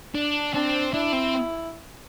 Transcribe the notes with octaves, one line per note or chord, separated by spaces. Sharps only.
D4
C4 D4
D4 E4
C4